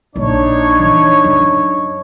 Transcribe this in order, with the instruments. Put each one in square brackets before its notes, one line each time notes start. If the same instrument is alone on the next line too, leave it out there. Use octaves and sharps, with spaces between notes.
[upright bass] A#1 [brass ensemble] D4 D#4 C#5
[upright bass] E3
F#2